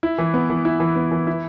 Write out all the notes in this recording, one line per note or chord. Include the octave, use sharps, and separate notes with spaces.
E4
E3
B3
E3
E4
E3
B3
E3
E4